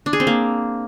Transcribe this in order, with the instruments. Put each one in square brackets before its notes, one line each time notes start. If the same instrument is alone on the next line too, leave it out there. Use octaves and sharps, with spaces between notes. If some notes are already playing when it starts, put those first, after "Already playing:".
[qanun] D4
G#4
C4
A#3